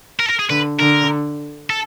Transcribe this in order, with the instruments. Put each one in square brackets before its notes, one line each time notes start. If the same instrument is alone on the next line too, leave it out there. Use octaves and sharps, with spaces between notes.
[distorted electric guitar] A#4
A4
A#4
G#4
[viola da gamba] D3 [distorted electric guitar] B4
[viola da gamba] D3 [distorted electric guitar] A#4
[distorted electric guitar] A4